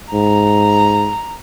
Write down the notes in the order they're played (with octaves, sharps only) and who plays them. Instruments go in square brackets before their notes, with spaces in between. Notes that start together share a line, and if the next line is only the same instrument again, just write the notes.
[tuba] G#2 [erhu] A#5